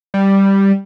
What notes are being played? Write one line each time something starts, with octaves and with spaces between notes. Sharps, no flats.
G3